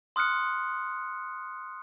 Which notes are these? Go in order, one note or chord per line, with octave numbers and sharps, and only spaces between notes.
C6 D#6 F6 F#6 C#7